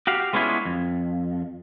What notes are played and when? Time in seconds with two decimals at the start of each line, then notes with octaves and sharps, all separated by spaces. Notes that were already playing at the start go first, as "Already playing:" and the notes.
0.07 F#4 G4 F5
0.33 G#3 B3 C#4 D4 E4 F4
0.65 F2